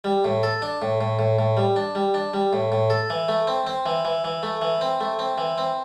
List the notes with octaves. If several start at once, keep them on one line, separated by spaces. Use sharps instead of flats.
G3
A2
A4
D4
A2
A2
A2
A2
G3
D4
G3
D4
G3
A2
A2
A4
E3
A3
C4
C4
E3
E3
E3
A3
E3
C4
A3
C4
E3
C4